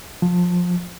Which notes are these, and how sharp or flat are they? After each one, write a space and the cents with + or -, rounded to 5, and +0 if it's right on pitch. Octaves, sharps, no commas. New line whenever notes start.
F3 +20